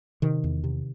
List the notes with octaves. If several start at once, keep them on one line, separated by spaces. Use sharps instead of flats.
C3 D#3
E2
C3